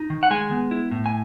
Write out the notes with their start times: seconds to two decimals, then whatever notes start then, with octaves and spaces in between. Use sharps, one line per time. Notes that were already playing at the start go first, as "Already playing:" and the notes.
Already playing: D#4
0.10 D#3
0.23 F#5
0.31 G#3 G#5
0.51 B3
0.71 E4
0.91 A2
1.06 G#5